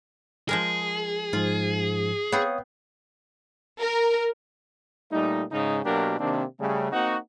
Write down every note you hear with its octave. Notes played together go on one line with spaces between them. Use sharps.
F3 G#3 G#4 A#4
G#2 F3 F4
B3 C4 C#5 F5 D#6
A#4
A#2 G3 A3 D#4
G#2 C#3 D#4
B2 F#3 A#3 D4 G4 A#4
C3 D#3 A#3 C4 D4
C#3 G3 A3
A#3 C4 D#4 F#4